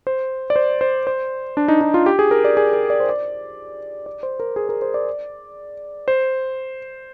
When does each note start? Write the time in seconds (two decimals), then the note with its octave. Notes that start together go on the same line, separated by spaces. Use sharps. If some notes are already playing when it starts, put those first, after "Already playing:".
0.07 C5
0.50 D5
0.56 C5
0.81 C5
1.07 C5
1.57 D4
1.68 D#4
1.81 D#4
1.94 F4
2.06 G4
2.19 G#4
2.31 A#4
2.45 D5
2.57 G#4
2.73 A#4
2.90 D5
3.00 C5
3.09 D5
4.06 D5
4.23 C5
4.40 A#4
4.56 G#4
4.69 A#4
4.82 C5
4.94 D5
6.08 C5